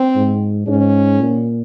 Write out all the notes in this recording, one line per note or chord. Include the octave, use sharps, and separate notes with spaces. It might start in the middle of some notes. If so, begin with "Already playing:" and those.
Already playing: C4
G#2
G#2 C#4
A#2